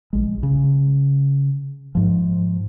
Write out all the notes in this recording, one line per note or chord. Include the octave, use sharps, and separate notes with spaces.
A#1 G#3
C#3
G#2 F3